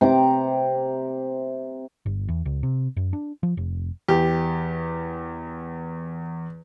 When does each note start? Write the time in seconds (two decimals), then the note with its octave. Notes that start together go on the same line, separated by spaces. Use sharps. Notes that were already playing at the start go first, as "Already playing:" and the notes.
0.01 C3 A#5 D6
2.06 G1
2.28 E2
2.45 C#2
2.63 C3
2.97 F#2
3.13 D4
3.43 F3
3.57 F1
4.08 E2 G4